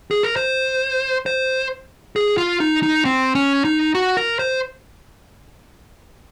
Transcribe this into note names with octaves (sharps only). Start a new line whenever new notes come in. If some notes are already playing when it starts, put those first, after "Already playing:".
G#4
A#4
C5
C5
G#4
F4
D#4
D#4
C4
C#4
D#4
F#4
A#4
C5